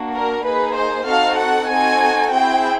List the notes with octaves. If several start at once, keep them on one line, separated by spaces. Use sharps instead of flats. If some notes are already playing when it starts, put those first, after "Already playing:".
Already playing: A#3 D4 F#4
A#4
A#3 D#4 G#4 B4
C5
C4 D#4 F#4 A4 F5
F#5
C4 D#4 F#4 A4 G#5
C4 E4 G#4 G5